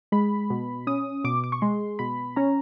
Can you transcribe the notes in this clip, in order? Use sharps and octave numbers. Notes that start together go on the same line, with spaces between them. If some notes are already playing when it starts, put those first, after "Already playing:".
G#3 B5
B2
C#4 D#6
B2 D6
D6
C#6
G#3 C6
B2 B5
C#4 A#5